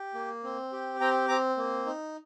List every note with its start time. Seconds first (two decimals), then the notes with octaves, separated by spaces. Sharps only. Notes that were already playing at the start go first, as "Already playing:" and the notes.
Already playing: G4
0.14 A#3
0.44 C4
0.72 G4
1.00 C4 G5 A#5
1.28 C4 A#5 D6
1.57 A#3
1.86 D#4